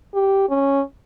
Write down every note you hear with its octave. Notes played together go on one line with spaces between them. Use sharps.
G4
C#4